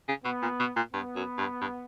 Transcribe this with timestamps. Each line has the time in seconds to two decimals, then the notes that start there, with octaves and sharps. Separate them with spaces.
0.08 C#3
0.25 B2 B3
0.42 A#2
0.60 B2
0.76 A#2
0.93 G2 B3
1.16 F#2
1.38 G2
1.61 G2